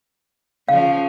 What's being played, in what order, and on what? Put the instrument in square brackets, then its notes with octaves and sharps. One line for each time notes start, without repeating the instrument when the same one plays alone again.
[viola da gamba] C#3 F3 [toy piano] F5